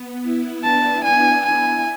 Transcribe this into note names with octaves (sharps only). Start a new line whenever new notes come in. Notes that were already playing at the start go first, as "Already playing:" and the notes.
Already playing: B3
E4
D4 A5
D4 G#5
E4 G#5